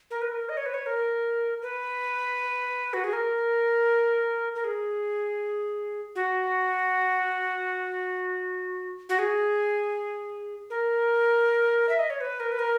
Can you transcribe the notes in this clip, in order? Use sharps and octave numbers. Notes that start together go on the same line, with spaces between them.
A#4
B4
A#4
D#5
C#5
B4
C#5
A#4
B4
F#4
G#4
A#4
A#4
G#4
F#4
F#4
G#4
A#4
E5
D#5
C#5
B4
A#4
B4
A#4